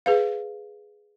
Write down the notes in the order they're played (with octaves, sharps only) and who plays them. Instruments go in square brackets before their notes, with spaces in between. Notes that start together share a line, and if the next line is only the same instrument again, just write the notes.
[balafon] G#4 B4 F5